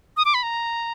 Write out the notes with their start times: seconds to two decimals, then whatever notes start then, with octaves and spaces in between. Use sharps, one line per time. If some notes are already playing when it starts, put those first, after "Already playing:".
0.17 D#6
0.25 D6
0.34 B5
0.43 A#5